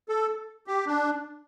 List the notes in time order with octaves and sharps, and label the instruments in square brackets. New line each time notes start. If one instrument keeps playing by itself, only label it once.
[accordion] A4
G4
D4